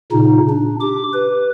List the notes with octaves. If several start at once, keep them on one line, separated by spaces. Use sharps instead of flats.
A#2 C#3 D#4
D4
G4 D6
B4